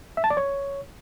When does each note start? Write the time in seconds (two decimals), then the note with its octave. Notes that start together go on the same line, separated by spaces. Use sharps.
0.17 E5
0.24 A5
0.30 D5
0.37 C#5